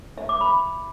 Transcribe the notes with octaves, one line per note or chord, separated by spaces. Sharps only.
E5
D6
B5